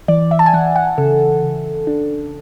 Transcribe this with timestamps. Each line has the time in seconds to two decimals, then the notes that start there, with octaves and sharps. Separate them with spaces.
0.08 E3 D5
0.31 E5
0.39 A5
0.46 G#5
0.53 E3 F#5
0.76 F#5
0.98 C#3 A4
1.43 C#3
1.87 D4